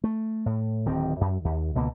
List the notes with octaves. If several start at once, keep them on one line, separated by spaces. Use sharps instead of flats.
A3
A2
D1 D#3 C4
F#2
D#2
C#2 B2 D3 A#3